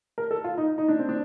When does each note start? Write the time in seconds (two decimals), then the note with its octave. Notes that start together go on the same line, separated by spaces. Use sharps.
0.18 A#4
0.31 A4
0.44 F4
0.58 D#4
0.78 D#4
0.88 D4
0.99 C4
1.09 D4